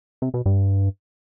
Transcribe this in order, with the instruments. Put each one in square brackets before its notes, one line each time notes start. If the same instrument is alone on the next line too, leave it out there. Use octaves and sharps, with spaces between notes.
[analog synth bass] C3
B2
G2